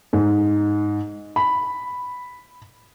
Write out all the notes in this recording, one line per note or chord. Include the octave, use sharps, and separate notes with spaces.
G#2
B5